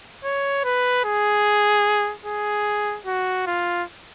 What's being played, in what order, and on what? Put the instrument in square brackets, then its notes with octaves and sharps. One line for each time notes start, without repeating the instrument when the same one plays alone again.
[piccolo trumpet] C#5
B4
G#4
G#4
F#4
F4